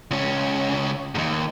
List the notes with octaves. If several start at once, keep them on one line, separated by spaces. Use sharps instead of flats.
C#2 C#4
D#2 G#2